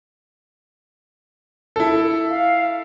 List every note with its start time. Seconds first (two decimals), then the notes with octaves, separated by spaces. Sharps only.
1.76 E4 A4
2.30 F5